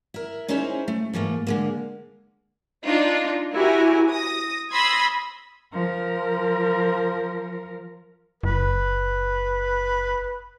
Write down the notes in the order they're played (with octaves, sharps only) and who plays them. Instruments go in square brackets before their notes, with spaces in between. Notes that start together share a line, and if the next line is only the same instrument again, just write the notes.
[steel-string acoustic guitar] E4 A#4
C#4 D#4 E4 G#4 C5 C#5
A3
G#2 E3 A3 A#3
D3 G#3 A#3
[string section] D4 D#4 F4
E4 F#4 G4 A#4 G#5
D#6 A#6
B5 C6 D#6 E6 G#6 A#6
[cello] F3 A#4
[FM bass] F#1 [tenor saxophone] B4